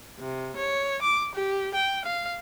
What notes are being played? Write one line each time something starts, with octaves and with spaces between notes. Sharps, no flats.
C3
C#5
D6
G4
G5
F5